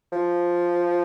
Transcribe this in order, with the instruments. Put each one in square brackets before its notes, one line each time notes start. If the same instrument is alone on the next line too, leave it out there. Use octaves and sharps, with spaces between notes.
[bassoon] F3